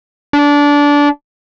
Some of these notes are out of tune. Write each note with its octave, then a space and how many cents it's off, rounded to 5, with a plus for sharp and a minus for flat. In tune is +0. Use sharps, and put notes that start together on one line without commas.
D4 -20